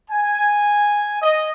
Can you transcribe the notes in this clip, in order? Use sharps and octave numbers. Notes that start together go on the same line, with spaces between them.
G#5
D#5